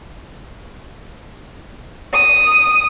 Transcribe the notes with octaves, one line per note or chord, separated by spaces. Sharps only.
D#6